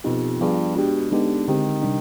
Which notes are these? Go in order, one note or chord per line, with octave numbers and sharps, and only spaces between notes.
F2 B2 B3 D#4 G4
G2 F3 B3 F4 G#4
B2 G#3 D4 G4
D3 G#3 B3 D#4 G4
D3 D#3 G#3 C4 G4
C3 G3 D4